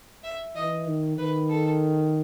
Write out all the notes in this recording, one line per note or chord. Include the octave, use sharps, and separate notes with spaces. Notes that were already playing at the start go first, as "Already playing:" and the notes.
E5
E3 D#5
D#3
D#3 B4
A4